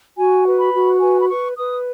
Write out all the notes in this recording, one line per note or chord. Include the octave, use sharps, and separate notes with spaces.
F#4 G#5
B4
B5
F#4
B4 G#5
B5
B4 C#6
B4 D#6